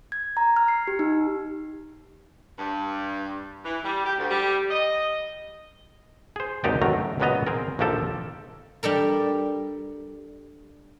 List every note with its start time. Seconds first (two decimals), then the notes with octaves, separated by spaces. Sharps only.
0.12 G#6
0.37 A#5
0.56 F6
0.68 C7
0.87 G4
0.99 D#4
2.58 G2
3.64 E3
3.84 G3
4.05 G4
4.18 D2
4.30 G3
4.71 D#5
6.36 G#4 C5
6.64 G#1 D#2 D#4 G4 D5 G5
6.82 A1 F#2 D#3 F#3 A3 A#5
7.20 C#2 A#2 F#3 B3 D#5 A#5
7.47 C4 G#4 A#4
7.79 A#1 D#2 F3 A#3 G4 A4
8.83 G3 D4 A4 A#4